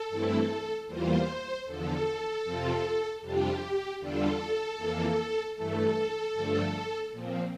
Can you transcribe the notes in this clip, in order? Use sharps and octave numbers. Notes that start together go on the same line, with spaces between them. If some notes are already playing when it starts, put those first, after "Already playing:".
Already playing: A4
G2 E3 A3 C4 E4
E2 E3 G3 A#3 F4 C5
E2 D3 F3 A4
F2 C3 F3 C4 F4
F2 C3 G3 D4 F4 G4
E2 D3 G3 D4 F4 A4
F2 E3 A#3
G2 E3 A3 A4
G2 D3 F3 A3 D4
A#2 F3 C4